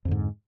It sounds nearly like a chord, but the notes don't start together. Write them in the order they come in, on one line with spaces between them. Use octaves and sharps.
F2 D3 G#2